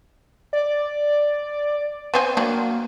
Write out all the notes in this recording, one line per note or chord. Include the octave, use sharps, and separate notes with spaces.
D5
B3 C4 G#5
F#3 A#3 D4